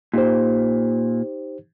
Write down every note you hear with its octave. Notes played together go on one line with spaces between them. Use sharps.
A#2 D#4 G4 C5